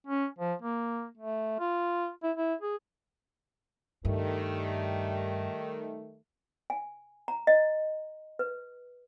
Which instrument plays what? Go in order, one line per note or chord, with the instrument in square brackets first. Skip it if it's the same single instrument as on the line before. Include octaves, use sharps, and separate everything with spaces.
[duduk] C#4
F3
A#3
A3
F4
E4
E4
G#4
[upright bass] G2 [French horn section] D#3 G3 A3
[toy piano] G#5
A#5
D#5
B4